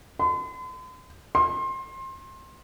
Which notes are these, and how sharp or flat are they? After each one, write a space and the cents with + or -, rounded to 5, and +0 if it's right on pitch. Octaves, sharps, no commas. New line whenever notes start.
C6 -45
C6 +25